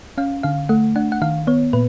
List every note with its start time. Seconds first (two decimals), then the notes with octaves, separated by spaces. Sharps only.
0.18 C#4 F5
0.43 D3 F5
0.69 A3 F#5
0.96 D4 F#5
1.12 F#5
1.22 D#3 F5
1.47 B3 C#5
1.73 A#2 B4